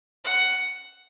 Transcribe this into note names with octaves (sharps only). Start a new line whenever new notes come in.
F#5